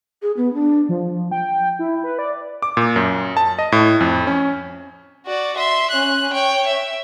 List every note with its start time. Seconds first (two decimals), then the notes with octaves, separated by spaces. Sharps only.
0.22 G#4
0.37 B3
0.54 D4
0.89 F3
1.31 G5
1.79 E4
2.04 B4
2.19 D5
2.62 D6
2.77 A#2
2.96 F#2
3.37 A5
3.59 D#5
3.72 A2
4.01 F2
4.27 C#4
5.27 F#4 D5
5.57 E5 C6
5.91 C#4 F#6
6.33 C#5 G5
6.67 E5